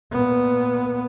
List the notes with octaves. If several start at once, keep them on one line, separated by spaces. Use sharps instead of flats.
A#2 B3